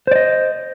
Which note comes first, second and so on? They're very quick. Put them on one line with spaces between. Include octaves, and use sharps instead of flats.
C5 D5 D#5